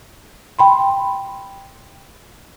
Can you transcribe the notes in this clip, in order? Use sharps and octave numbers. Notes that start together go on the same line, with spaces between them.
G5 B5 C6